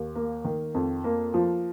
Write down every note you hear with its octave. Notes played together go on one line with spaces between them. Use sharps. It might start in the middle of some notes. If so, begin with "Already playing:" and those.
Already playing: D#2
A#3
D#3
F2
A#3
F3